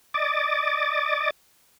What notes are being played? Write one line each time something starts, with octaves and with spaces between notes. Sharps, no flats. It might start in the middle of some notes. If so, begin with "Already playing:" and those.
D5 D#5 D6 A6